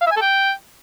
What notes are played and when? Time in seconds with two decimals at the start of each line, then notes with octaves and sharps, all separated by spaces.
0.01 F5
0.06 E5
0.11 G#5
0.17 A4
0.22 G5